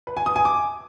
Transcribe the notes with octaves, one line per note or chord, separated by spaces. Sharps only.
B4
G#5
D#6
G#5
D6